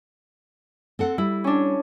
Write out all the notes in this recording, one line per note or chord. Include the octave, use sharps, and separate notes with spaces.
C4 A4 F#5
G3 E4
C#4 D4